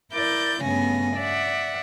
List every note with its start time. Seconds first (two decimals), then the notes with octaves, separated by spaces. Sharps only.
0.11 E4 A#4 D5 G6 A6
0.62 G2 C#3 A3 B3 G#5 A#6
1.16 D5 E5 F#5